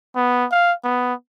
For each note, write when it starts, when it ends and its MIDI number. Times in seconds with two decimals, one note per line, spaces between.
0.16 0.46 59
0.52 0.73 77
0.84 1.14 59